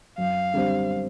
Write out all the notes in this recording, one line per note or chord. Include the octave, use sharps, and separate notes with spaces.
F#2 F5
D3 G3 C4